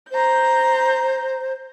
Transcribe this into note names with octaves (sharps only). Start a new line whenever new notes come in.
C5 A#5 G6